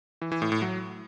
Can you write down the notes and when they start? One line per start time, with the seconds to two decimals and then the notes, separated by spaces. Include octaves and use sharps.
0.22 E3
0.32 E3
0.42 A2
0.52 A2
0.62 F#3